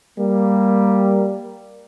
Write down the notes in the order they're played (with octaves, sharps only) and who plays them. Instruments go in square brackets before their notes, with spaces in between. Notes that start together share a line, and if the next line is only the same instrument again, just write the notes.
[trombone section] G3 A#3